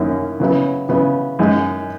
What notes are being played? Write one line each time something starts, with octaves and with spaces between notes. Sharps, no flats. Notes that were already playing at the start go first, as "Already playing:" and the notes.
Already playing: F#2 D#3 A#3 C#4 E4
C#3 F#3 B3 E4
C#3 F#3 B3 E4
F#2 D#3 G#3 D#4